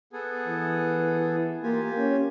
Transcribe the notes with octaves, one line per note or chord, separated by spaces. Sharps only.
B3 G#4 A4
E3
A#3 F4 G4 G#5
C#4